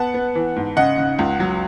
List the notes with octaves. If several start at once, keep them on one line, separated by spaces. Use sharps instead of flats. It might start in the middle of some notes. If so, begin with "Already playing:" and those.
Already playing: B3 F#5 A5
B3
E3
G#2
C#3 D#5 F#5
C#3
C#2
F#3